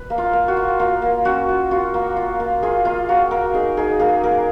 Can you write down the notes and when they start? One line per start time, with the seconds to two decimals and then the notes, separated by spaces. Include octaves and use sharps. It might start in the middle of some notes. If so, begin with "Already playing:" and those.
Already playing: B4
0.10 A#3
0.18 F4
0.33 A#3
0.48 F#4
0.57 F4
0.79 A#3 F4
1.02 A#3
1.25 C#4 F#4
1.49 F4
1.71 F4 F#4
1.94 A#3
2.17 F4
2.40 A#3
2.62 F4 G#4
2.85 A#3 F4
3.09 A#3 F#4
3.31 A#3 A#4
3.54 D#4 G#4
3.77 D#4 G#4
3.99 A#3 G#4
4.24 A#3 A#4